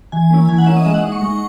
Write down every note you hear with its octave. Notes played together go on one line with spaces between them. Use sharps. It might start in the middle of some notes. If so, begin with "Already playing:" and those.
E3 G#5
A#3 C#4 E4
E3 G#5
F#5
A#3 C#4 E4 E5
D#5
G#3 E5
F#5
D#4
C#6
G#3